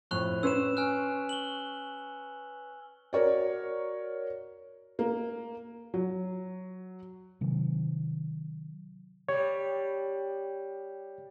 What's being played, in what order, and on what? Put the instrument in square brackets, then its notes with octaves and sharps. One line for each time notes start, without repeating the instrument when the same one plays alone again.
[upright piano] F2 A2 [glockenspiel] C#6 F#6 F7
[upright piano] C#4 B4 C6 [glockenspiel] E6 E7
[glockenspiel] G#5 F6 F#6
F#7 G7
[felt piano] F#4 A#4 C#5 D5
A#3
F#3
[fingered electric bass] C3 D#3 F#3
[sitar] G3 [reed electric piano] C#5